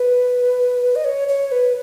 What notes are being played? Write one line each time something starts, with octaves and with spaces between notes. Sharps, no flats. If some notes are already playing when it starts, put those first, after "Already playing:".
Already playing: B4
D#5
C#5
C#5
B4